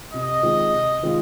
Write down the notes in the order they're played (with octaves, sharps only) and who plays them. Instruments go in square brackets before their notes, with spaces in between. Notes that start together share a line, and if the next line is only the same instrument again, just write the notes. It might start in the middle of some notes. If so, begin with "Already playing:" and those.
[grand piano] C3 [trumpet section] D#5
[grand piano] D#3 G#3 C4 F4
C3
D#3 G#3 C4 F4